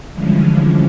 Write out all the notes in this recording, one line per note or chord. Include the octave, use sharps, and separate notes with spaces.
D3 E3 F3 G3 G#3 C#4